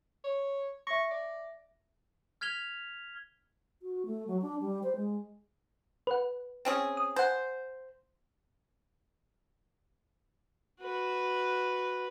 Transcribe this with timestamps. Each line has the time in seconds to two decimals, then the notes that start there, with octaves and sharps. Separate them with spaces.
0.24 C#5
0.87 E5 C#6 A#6
1.11 D5
2.41 F6 G#6 B6 F7 G7
3.82 F#4
4.06 A3
4.27 F#3
4.42 D4
4.60 G3
4.83 C5
4.96 G#3
6.07 B4 F#5
6.65 C4 C#4 G#4
6.97 D#6
7.16 C5 F#5 G#5
10.81 F#4 B4